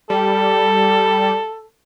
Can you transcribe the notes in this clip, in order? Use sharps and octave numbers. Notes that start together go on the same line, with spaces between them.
G3 A4